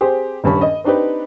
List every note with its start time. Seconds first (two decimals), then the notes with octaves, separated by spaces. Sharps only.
0.01 C4 G4 G#4 C5
0.44 D#1 G2 C#4 B5
0.61 D#5
0.84 C4 D4 D#4 G4 B4